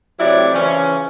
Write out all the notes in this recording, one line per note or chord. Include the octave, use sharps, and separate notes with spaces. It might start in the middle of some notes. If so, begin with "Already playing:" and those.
A2 C3 F#3 E4 G4 D5
C#3 E3 F3 C#4